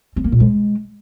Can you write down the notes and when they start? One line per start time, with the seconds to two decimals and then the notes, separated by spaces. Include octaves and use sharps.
0.16 C4
0.24 A#3
0.32 A#2
0.40 G#3